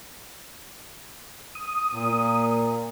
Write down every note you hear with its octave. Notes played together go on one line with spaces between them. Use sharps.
D#6
A#2 A#3